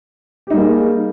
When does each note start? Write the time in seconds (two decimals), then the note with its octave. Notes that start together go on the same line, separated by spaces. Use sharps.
0.47 G4
0.50 D#4
0.54 G3
0.57 A#3
0.61 G#4